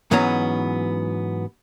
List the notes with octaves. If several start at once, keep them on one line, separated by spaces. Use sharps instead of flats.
G#2 E3 F#3 B3 C#4 A#5